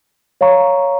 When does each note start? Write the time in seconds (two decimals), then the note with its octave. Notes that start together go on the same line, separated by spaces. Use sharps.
0.41 C#5 F5 A#5 C#6